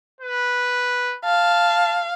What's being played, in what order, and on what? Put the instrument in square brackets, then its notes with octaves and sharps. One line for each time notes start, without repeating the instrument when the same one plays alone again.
[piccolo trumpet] B4
[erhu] F5 [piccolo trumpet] A5